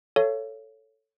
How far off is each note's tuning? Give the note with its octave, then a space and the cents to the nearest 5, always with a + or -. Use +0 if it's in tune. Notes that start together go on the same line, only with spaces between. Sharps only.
A4 +5 C#5 +0 F5 -45